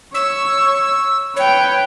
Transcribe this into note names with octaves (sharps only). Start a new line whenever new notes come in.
C#5 E6
B4 C#5 G5